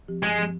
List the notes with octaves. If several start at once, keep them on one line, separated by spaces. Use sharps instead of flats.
F3 C4 G4
G2 G#3
F3 C4 G4